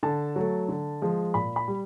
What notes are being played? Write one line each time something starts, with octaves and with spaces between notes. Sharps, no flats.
D3 A5
F#3 A3
D3
F3 G#3
A#2 B5
B5
G3